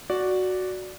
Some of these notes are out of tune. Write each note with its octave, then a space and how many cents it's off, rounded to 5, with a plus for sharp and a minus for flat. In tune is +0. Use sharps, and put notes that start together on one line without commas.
F#4 +0 D5 -5